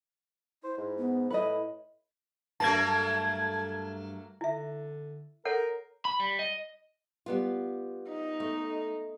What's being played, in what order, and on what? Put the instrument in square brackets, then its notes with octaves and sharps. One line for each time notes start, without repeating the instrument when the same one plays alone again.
[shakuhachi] E4 [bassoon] C5
[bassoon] G#2
[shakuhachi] B3
[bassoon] A2 [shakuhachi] E4 [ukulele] B4 D#5
[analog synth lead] G2 [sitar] F#3 A3 A#3 [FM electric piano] A5 G#6
[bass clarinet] D3 [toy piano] E4 E5
[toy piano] A4 C#5 F#5 [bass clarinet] A#4
[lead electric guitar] B5
G3
D#5
[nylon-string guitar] G3 B3 F4
[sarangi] D#4
[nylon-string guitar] A3